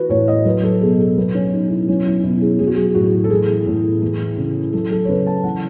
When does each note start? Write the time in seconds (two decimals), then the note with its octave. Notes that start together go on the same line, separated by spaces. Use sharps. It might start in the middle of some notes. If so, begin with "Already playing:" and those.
Already playing: E3 F#4 B4
0.09 A2 C#5
0.28 D#5
0.45 F#3 B4
0.64 A4
0.81 B2 G#4
0.99 A4
1.17 F#3 B3
1.35 C#4
1.52 B2 D#4
1.70 E4
1.88 F#3 C#4
2.05 E4
2.23 B2 E4
2.41 G#4
2.59 F#3 G#4
2.67 F#4
2.75 G#4
2.95 A2 F#4
3.24 A4
3.30 E3 G#4
3.67 A2
4.02 E3
4.37 C#3
4.73 F#3 A4
4.91 A4
5.04 C#5
5.08 C#3 B4
5.27 A5
5.44 E3 F#5